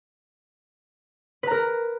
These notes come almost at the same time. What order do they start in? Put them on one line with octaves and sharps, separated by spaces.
B4 A#5 A#4